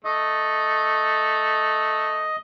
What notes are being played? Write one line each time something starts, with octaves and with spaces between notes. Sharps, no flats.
A3 D#5